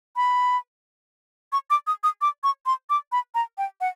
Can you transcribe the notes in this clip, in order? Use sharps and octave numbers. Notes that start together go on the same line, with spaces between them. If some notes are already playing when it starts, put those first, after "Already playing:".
B5
C#6
D6
D#6
D#6
D6
C#6
C6
D6
B5
A#5
G5
F#5